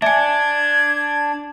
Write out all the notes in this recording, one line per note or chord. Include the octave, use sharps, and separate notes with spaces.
D4 E5 G#5 G#6